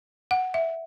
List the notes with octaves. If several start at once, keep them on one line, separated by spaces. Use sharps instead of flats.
F#5
E5